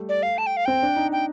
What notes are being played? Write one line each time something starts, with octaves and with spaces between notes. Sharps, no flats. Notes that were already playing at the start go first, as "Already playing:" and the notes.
Already playing: G3 A3
D5
F5
A5
G5
F5
C4 G5
D4
D#4
G5